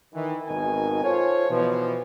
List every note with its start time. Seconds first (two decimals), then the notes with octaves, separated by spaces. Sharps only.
0.14 D#3 E3
0.48 G#1 B2 D#3 D#4 G#5
1.03 F4 A4 C5 C#5
1.50 B2 E3 F3